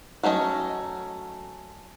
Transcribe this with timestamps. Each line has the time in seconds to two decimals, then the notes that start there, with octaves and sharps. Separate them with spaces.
0.23 F#3 A3 C#4 E4 D#5